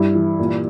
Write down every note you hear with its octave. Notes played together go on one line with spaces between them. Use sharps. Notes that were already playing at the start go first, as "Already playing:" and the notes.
Already playing: G2 E4
E3
A#2